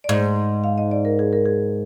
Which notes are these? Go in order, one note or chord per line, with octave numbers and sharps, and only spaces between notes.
D5
G#2 D#5
F5
D#5
D5
A#4
G#4
A#4
G#4